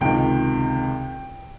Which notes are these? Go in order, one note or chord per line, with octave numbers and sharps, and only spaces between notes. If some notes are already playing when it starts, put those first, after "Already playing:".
C#2 C3 D#3 G5